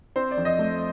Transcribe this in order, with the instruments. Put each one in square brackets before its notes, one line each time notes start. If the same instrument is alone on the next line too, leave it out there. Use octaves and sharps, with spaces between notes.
[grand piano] C4 C5
D5
F2
D#5
A3